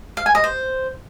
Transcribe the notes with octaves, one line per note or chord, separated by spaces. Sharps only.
F5
G#5
D#5
C5